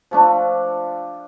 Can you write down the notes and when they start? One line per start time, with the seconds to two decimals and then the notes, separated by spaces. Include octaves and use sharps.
0.11 F3 A3 D4